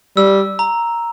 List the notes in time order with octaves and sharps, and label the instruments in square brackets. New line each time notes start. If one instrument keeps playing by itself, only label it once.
[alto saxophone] G3 [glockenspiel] E6
[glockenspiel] A#5